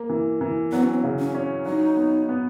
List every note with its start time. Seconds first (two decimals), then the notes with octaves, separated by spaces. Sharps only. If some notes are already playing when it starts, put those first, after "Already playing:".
Already playing: A#3
0.10 E3
0.41 E3
0.72 F#3 B3
0.83 C#4
0.94 B3
1.04 C#3
1.19 C#4
1.35 C#4
1.66 F#3 D#4
1.97 B3
2.29 B3